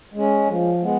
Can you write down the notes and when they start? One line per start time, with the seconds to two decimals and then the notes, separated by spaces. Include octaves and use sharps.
0.14 G#3 C#4
0.48 F3
0.83 G#3 B3